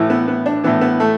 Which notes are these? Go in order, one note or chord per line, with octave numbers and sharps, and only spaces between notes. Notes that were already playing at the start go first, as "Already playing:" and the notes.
Already playing: A2 E3
B3
B3
D4
A2 E3 B3
B3
A3